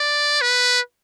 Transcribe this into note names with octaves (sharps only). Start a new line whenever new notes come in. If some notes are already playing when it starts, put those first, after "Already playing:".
Already playing: D5
B4